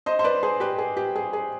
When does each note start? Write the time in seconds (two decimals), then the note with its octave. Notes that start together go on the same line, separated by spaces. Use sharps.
0.06 C5 D#5
0.19 C5
0.24 B4 D5
0.43 G#4 C5
0.60 G4 B4
0.78 G#4
0.97 G4
1.16 G#4
1.33 G#4